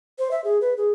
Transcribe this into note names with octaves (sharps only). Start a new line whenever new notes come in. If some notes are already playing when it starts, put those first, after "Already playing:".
C5
E5
G#4
B4
G#4